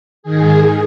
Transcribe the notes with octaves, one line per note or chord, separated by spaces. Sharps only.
G#2 D#3 G#4